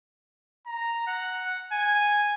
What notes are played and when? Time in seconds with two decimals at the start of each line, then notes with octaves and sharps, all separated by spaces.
0.66 A#5
1.07 F#5
1.72 G#5